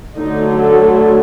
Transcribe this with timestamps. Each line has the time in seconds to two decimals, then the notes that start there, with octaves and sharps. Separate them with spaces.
0.18 D3 F#3 A3 D#4
0.60 A4